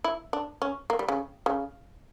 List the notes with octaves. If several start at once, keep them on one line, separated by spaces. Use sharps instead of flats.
E4
D4
C#4
A#3
G3
C#3
C#3